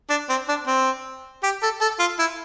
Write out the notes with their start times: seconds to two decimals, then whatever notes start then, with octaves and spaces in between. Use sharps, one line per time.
0.10 D4
0.29 C4
0.48 D4
0.67 C4
1.43 G4
1.62 A4
1.81 A4
1.99 F4
2.19 E4